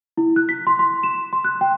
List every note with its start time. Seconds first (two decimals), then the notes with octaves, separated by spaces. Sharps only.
0.17 E4
0.36 F#6
0.49 B6
0.67 C6
0.79 C6
1.03 E7
1.33 C6
1.44 F#6
1.61 G5